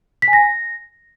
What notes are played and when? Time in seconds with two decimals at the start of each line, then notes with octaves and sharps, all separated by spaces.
0.22 B6
0.28 G#5
0.33 A#6